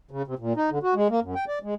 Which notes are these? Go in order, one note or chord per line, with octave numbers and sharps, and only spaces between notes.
C#3
C3
A#2
D#4
D3
F#4
G#3
A#3
F#2
G5
D5
G#3